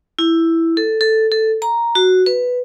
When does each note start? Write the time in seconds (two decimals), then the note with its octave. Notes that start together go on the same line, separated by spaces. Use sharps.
0.19 E4
0.77 A4
1.01 A4
1.32 A4
1.62 A#5
1.95 F#4
2.26 B4